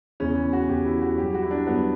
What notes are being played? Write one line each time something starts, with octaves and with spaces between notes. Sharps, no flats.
E2 C#3 E3 C#4
F#4
E2 C#3 E3 G4
E4
F#4
G2 F#3 G4
F#4
E4
D4
G2 F#3 B3